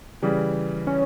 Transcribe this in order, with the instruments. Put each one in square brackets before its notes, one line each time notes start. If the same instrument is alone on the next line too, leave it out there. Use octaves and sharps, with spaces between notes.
[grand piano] C#3 E3 G3
[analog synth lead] C#4